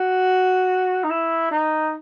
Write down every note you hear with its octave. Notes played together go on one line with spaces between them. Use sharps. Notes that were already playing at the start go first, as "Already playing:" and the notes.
Already playing: F#4
D#4
E4
D#4